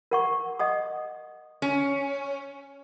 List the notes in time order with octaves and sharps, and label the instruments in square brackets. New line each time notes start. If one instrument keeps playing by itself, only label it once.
[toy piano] A#4 F#5 C#6
D#5 F#5 D#6
[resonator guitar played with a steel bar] C#4